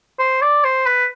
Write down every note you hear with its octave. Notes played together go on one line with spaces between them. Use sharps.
C5
D5
C5
B4